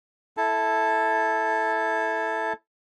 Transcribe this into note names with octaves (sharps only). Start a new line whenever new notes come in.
E4 A4 A5